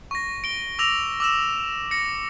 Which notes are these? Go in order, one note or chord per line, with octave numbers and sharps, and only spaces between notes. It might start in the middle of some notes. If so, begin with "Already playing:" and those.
C#6 A#6
D7 G7
D6 E6 A#6 F7
D6 E6 E7
A#6 C#7